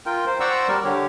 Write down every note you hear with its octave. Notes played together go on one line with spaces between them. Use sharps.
F4 A#4 G5
C5
C5 D5 F#5 A#5 C#6 E6
G3 A#4
D3 G4 C#5